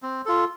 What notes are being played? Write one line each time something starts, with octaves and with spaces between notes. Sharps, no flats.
C4
F4 A4